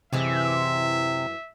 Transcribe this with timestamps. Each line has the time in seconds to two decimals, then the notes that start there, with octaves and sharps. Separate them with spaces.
0.13 F#2 C3 E3 G#3 E5